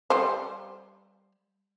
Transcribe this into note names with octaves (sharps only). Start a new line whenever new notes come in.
G3 C5